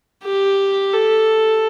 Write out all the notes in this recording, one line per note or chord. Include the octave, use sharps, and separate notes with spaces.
G4
A4